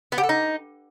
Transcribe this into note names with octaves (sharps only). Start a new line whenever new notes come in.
B3
G4
A4
D#4